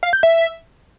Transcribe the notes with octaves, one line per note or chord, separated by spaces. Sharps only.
F5
G6
E5